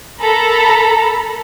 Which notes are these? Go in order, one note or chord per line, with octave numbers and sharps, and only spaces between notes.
A4 A#4 A#5 B5